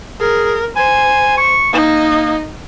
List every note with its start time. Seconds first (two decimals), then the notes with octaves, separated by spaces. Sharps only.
0.20 G#4 A#4
0.76 C5 G#5
1.38 C#6
1.73 A#3 D#4 D#5